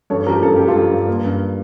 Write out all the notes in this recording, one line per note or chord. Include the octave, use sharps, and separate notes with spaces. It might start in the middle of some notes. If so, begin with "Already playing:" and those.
G2 A4 C#5
F3 G4 A#4
G2 A4
G2 G4
F4 A4
G2
G2
A#3
G2